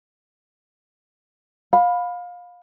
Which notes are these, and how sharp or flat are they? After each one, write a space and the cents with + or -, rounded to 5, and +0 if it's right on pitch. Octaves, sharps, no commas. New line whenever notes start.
F5 +25 B5 +0